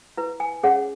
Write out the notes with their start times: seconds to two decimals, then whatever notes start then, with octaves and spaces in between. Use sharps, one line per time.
0.17 E4 B4
0.40 G#5
0.63 C#4 G#4 C#5 F#5